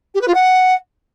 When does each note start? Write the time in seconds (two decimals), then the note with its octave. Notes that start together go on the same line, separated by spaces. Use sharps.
0.14 G4
0.21 B4
0.27 F4
0.34 F#5